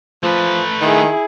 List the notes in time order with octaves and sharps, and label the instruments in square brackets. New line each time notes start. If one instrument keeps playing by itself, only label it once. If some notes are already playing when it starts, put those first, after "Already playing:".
[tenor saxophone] F3 [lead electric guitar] A3 B4
[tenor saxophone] D#3 [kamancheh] E4 G#4